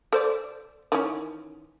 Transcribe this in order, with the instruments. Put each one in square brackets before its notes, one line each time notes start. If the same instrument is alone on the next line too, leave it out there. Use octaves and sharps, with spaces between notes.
[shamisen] A4 C5 D5
D#3 E3 C#4